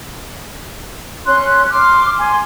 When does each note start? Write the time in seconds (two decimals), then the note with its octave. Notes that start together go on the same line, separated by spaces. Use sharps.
1.24 C#4 C6 F#6
1.70 C6 D6 F6
2.18 G#5 C6